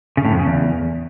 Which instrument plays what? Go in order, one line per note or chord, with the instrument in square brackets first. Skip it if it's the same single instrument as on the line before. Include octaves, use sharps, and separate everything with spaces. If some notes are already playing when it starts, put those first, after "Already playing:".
[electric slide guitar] C#3
A2
F2
C#3
E2